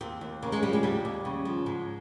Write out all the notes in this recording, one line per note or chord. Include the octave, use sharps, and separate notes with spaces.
D#2 C4
D#2
C#3 A#3
G#3
F3 G3
G#3
D#2 G3
D#2
C#3
F3
G#2 G#3